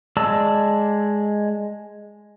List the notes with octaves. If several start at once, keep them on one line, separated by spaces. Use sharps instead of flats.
G#3 D5 A5 E6